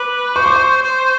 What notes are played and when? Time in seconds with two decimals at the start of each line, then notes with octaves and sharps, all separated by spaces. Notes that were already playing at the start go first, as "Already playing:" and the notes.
Already playing: B4 D6
0.36 C5 C#6
0.46 D6
0.56 C#6
0.83 C5